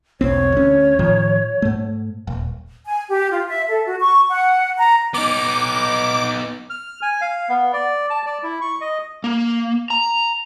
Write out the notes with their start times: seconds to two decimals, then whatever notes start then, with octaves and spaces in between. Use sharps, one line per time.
0.21 E1 B1 C4 C#5
0.52 D2 C#4
0.99 A2 D#3 F3
1.62 G#2 A3
2.27 D#1
2.86 G#5
3.09 G4
3.31 F4
3.48 E5
3.70 A4
3.86 F#4
4.00 C#6
4.29 F#5
4.77 A#5
5.14 B3 D#4 D6
6.70 F6
7.02 G#5
7.21 F5
7.49 B3
7.73 D5
8.10 A5
8.26 D5
8.43 E4
8.61 C#6
8.81 D#5
9.24 A#3
9.90 A#5